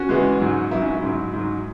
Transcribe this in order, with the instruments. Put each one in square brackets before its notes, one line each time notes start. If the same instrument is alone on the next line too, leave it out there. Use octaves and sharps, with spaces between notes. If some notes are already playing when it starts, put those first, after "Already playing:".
Already playing: [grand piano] C#4 F#4
E2 E3 G#3
G#2 F#3
G#2 F#3 E4
C#4
E4
G#2 F#3
G#2 F#3